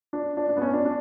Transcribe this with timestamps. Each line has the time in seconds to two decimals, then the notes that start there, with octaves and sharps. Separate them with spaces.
0.13 D4
0.37 D4
0.49 D4
0.57 B3
0.61 C#4
0.73 D4
0.85 D4